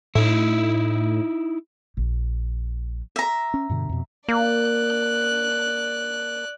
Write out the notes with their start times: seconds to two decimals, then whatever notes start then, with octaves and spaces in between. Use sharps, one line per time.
0.15 A2 D#4 E4
1.97 A#1
3.16 E5 A#5
3.54 C#4
3.69 G2 B2 D3
3.89 F2 B2
4.28 A#3 D5 F#6